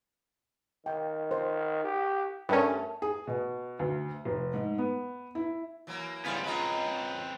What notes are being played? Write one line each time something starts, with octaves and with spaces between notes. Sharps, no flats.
D#3 G5
C5
G4
G2 A3 C#4 A#4 E5 A5
G#4
B2
D2
F1
G#2
B3
E4
E3 F#3 A#3
C#3 G3 B3 E4 C5 F5 G#5
G#3 C4 C#4 F4 B4 D#5 A#5